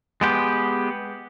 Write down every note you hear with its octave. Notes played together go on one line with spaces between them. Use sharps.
G#3 B3 G4